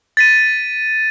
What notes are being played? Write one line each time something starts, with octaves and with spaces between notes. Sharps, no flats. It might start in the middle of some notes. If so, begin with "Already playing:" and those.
A6 B6 D#7